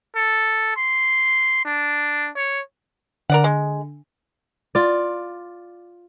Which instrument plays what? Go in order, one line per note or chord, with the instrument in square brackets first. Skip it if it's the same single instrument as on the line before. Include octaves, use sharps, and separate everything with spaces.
[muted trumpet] A4
C6
D4
C#5
[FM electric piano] D3 [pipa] A#4 D5 F#5
[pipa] G#3
[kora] F4 D5